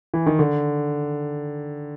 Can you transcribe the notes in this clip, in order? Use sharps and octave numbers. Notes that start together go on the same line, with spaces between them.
E3
D#3
D3